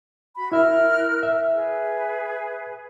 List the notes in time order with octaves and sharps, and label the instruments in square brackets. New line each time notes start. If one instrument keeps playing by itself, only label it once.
[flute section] F#4 B5
[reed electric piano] E4 E5 [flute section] A#4 F6 F#6
[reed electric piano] E5
[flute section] G#4 B4